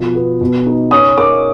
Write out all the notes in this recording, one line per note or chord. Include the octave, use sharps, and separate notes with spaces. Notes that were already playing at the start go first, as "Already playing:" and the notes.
Already playing: B2 F3
B3
B2
D#4
C#4 D#6
A#3 D6